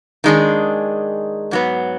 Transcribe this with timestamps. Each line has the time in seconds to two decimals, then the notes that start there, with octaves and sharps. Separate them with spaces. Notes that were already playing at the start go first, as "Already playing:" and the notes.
0.24 D#3 G#3 D4 G#4
1.51 G#2 F#3 B3